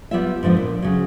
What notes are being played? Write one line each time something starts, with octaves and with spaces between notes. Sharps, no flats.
G3 B3 F4 E5
G#2 D3 F3 B3
A#2
C#3 F#3